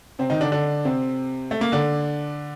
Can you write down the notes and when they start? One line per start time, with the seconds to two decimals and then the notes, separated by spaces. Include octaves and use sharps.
0.19 C3 C4
0.30 D#3 D#4
0.41 D3 D4
0.52 D3 D4
0.85 C3 C4
1.51 A3
1.61 A#3
1.72 D3 D4